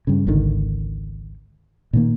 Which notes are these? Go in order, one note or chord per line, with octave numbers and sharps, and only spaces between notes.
G2 C#3
G#1 C#2 D3 D#3
A#2 D#3 A#3